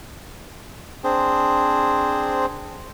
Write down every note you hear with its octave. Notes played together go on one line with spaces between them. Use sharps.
C4 D4 G#4 C5